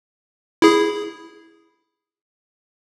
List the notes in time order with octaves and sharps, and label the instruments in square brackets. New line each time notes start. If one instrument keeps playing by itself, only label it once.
[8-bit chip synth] E4 G#4